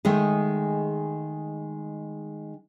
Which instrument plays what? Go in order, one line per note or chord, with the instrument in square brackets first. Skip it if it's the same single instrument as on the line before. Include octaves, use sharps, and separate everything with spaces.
[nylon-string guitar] D#3 G#3 A3 G#4